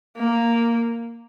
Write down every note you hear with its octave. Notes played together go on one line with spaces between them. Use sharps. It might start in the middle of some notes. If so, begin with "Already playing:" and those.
A#3